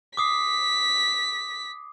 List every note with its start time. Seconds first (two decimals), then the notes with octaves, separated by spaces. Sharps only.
0.17 D6 D#6 B6 C7